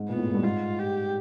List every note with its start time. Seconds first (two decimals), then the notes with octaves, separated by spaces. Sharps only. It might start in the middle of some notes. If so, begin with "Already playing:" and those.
Already playing: G#2
0.09 A#2 B3
0.18 A2
0.26 G#2
0.35 G2
0.43 G#2 F4
0.79 G4